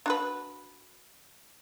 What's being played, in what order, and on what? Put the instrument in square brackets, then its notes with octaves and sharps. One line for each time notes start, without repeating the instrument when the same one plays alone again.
[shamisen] D4 F#4 B4